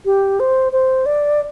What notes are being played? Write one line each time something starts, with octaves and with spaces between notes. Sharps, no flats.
G4
C5
C5
D5